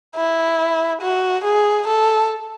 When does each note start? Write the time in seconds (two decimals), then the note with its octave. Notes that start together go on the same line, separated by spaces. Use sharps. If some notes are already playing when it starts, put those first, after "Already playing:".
0.16 E4
1.02 F#4
1.45 G#4
1.88 A4